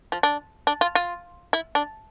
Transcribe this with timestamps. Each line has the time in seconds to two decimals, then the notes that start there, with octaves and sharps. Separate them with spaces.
0.12 F3
0.23 D4
0.67 D4
0.81 F4
0.95 F4
1.53 E4
1.75 D4